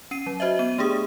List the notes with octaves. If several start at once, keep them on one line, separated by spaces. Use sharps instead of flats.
C#4 C7 D#7
F#3
F#4 C5 D#5 E5
B3 D#7
A3 D4 G4 G#4 D#6